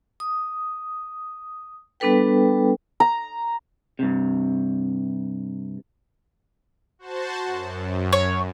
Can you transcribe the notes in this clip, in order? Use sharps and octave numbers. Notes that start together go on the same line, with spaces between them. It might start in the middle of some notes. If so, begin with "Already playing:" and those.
D#6
G3 B3 D4 A4 B4 G5
A#5
G2 C3
F#4 C5 A5
F#2
C#5